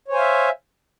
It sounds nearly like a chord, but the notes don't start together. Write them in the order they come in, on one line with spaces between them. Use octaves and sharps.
C#5 C5 G#5 F5 E5